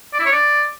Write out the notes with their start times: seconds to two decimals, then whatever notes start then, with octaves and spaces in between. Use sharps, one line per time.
0.13 D5
0.20 E4
0.26 C#5
0.32 D5